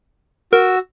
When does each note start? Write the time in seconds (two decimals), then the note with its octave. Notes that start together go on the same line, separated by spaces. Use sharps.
0.53 F#4 A#4 E6